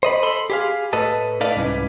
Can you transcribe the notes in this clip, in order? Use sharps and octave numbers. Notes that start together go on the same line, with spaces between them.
C5 D#5 B5
A4 B5 C6
G4 G#4 F5
A2 A4 B4 D#5 A5
D#4 A4 B4 D5 D#5 F5
C2 G#2 G3 C#4 E4 B4